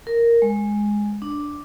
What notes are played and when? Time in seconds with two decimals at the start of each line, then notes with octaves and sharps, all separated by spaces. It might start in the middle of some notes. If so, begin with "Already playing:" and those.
0.07 A#4
0.42 G#3
1.22 D4